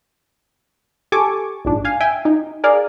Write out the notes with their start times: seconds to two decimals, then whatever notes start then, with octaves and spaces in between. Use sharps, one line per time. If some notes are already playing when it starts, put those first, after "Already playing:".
1.12 G4 A4 G#5 C#6 D6
1.65 A#1 G#2 D4
1.85 F5 G#5
2.00 E5 G5 G#5
2.25 D#4
2.64 G#4 A#4 D5 F5